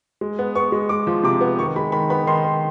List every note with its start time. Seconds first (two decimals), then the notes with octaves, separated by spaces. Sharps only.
0.21 G#3
0.39 B3
0.55 B3 C#6
0.72 G#3
0.89 G#3 D6
1.07 F3
1.24 C3 D6
1.41 B3
1.58 D#3 C#6
1.76 G#3 B5
1.92 D#3 B5
2.10 B3 B5
2.27 D#3 C6
2.44 D#3